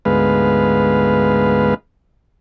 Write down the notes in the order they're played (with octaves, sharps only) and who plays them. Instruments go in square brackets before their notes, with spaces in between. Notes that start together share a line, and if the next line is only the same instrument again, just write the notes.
[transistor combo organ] D2 G#2 G#3 B3 B4 F5